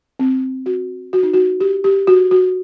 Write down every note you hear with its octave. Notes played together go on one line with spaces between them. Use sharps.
C4
F#4
F#4
D#4
F#4
G4
G4
F#4
F#4